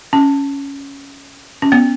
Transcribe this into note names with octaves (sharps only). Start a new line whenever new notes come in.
C#4
C#4
B3